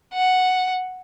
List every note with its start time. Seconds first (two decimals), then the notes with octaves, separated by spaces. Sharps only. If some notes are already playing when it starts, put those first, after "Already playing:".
0.14 F#5